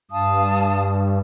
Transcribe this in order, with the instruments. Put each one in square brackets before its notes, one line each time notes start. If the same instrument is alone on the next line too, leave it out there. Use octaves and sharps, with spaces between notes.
[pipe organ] G2 [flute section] F5 A5 D#6